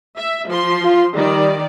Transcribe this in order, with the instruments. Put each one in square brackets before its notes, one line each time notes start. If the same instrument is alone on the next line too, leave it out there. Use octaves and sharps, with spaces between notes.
[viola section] E5
F3 C6
[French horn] F4
[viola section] D#3 D5 [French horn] G3